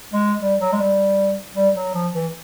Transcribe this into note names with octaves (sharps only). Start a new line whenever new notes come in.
G#3
G3
F#3
G#3
G3
G3
F#3
F3
E3